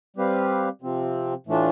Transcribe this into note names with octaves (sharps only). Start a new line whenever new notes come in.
G3 C4 G4 B4 F5
C3 F3 C4
A2 E3 A3 D4 F4